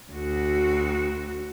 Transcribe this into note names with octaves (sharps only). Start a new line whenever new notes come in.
D2 F#4